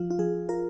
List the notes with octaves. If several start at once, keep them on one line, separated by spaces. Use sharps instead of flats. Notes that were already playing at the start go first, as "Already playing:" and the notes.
Already playing: F3 F4
F4
F3 G#4
F4 A#4